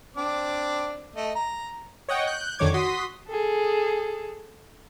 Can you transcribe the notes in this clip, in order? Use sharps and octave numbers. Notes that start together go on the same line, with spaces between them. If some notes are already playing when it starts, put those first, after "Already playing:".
C4 D4 D6
A3 D#5
A#5
C#5 D#5 F#5 G5
F#6 G6
F2 D3 D#3 C#5 D6 G#6
F#4 C6 D#6 B6
G#4 A4